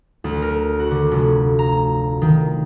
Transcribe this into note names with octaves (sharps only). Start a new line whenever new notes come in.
D2
A#4
F#4
D3
F1
A#5
D#3